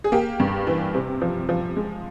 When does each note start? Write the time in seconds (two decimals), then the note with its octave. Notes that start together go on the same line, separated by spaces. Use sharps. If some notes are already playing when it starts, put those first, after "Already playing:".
0.04 G#4
0.12 A#3 G4
0.40 G2
0.67 E3
0.94 C3
1.21 F3
1.49 F3
1.77 G#3